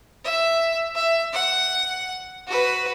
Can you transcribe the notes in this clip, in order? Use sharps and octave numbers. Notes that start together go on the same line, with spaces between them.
E5
E5
F#5
F#4 B4